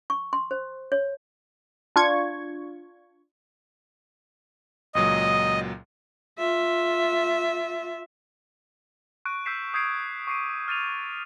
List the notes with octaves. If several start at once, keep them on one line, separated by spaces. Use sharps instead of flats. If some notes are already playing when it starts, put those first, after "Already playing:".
C#6
C6
C5
C#5
D4 F4 C#6 G#6
C#2 A#2 F#3 D#5 D#6
F4 E5
C#6 F#6 D7
E6 G6 B6 C7 E7
D#6 G6 G#6 C7 D7
C#6 D6 C7 D7 D#7
F6 A6 D#7 F7